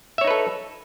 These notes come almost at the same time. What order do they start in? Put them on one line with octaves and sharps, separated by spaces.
E5 C#5 D#4 B4 A4